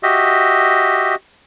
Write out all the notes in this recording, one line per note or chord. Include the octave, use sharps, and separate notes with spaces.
F#4 G4 D#5 E5